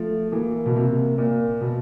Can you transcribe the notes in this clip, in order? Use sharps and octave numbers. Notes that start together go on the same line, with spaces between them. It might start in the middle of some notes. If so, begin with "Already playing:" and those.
Already playing: F3 A3
E3 A#3
B2
C3
A#2 A#3
B2